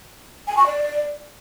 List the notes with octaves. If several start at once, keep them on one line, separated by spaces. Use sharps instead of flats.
G#5
C#6
D5